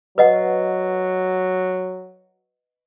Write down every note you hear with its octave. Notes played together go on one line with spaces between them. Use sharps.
F#3 B4 D#5 F#5